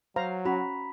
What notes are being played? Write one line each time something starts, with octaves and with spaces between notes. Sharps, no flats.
F#3 C5 F5 A#5
C#4 F#4 A#5 B5 B6